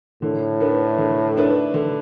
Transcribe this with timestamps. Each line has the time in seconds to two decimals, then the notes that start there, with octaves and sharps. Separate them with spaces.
0.22 A2 D3
0.60 A3 D4 B4
0.98 D3
1.36 A3 D4 B4
1.74 D3